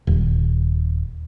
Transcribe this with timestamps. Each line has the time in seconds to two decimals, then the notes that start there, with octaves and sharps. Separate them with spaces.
0.07 D#1